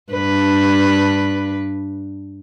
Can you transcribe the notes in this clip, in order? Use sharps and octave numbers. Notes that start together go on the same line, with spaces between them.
G2 D4 B4